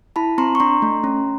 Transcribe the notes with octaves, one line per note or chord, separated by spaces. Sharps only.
E4 A5 B5
C4 A#5 C6
C#6
D4 A#5 C6
A3
C#4